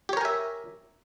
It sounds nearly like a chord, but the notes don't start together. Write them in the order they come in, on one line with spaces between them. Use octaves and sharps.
G4 C#5 A#4 G#5 E5